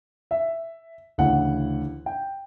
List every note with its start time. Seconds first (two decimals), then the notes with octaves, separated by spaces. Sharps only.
0.31 E5
1.18 D2 C#3 E3 F#5
2.06 G5